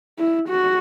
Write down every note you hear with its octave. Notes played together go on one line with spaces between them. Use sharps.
E4
F#4